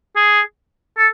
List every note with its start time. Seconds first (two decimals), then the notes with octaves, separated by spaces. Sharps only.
0.16 G#4
0.98 A4